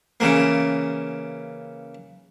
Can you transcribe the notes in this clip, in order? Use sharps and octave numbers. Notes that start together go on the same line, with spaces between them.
C#3 E3 A#3